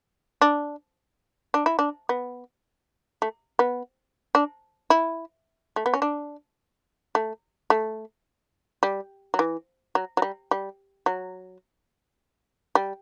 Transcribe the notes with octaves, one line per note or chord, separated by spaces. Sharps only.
D4
D4
E4
D4
B3
A3
B3
D4
E4
A3
B3
C#4
D4
A3
A3
G3
F#3
E3
F#3
F#3
G3
G3
F#3
G3